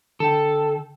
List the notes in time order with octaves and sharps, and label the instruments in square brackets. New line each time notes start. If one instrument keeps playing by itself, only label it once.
[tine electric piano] D3 G5 [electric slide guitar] A4